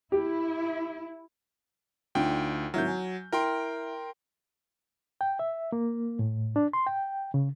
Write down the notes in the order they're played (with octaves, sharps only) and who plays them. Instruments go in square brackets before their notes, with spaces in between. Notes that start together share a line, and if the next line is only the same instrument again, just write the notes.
[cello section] E4 [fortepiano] G4
[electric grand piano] D2 G5 [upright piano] D4 D#4 F4
[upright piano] G#1 E4 F6 [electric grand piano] F#3 G6
[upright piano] G#5
[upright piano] E4 [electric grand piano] A#4 G5 C6
[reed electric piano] G5
E5
A#3
A2
D4
C6
G5
C#3